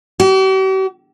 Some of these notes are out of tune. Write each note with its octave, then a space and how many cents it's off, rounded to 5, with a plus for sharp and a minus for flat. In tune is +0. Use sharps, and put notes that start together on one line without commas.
G4 -45